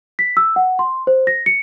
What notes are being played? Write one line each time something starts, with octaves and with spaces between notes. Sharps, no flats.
B6
E6
F#5
C6
C5
A#6
C#7